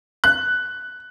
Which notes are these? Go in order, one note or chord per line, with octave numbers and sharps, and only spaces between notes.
F#6